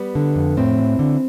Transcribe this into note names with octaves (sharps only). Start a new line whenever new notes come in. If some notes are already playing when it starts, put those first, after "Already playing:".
Already playing: G3 B3
D3
F2
A2 C4
E3
D3